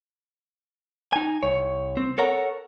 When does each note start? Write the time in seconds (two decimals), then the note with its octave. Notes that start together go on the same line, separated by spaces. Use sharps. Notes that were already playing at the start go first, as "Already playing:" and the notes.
1.13 D#4 G#5
1.43 C2 C#5
1.97 C4
2.18 A4 A#4 C#5 F#5 A#5